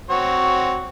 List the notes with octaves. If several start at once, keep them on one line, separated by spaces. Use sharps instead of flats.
C4 F#4 C#5